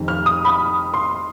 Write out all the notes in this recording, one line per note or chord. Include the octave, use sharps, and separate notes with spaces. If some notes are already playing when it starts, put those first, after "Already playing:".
Already playing: F1 F2 D#3
F6
D#6
B5
C6